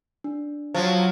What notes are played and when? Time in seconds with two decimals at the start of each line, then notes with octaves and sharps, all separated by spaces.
0.24 D4
0.74 F3 F#3